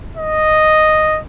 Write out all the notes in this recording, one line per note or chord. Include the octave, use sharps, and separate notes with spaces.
D#5